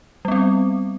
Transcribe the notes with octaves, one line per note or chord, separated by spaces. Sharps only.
G3 B3 C4